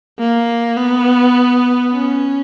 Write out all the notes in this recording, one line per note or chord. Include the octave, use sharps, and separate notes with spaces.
A#3
B3
C#4